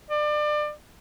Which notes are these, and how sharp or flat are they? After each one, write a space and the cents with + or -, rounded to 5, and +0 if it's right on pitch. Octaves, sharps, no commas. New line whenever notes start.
D5 +30